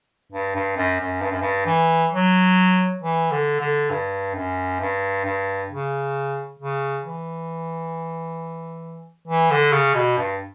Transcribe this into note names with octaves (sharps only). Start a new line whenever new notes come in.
G2
G2
F#2
F#2
G2
F#2
G2
E3
F#3
E3
D3
D3
G2
F#2
G2
G2
C#3
C#3
E3
E3
D3
C#3
B2
G2